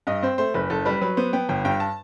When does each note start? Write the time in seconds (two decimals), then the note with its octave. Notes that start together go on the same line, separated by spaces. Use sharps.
0.07 G2 D#5
0.23 C4 C5
0.38 A3 C5
0.54 F#1 B4
0.70 F#1 A4
0.85 G3 B4
1.01 F#3 B4
1.17 B3 C5
1.33 B3 G5
1.49 G1 G5
1.65 G2 G5
1.80 A5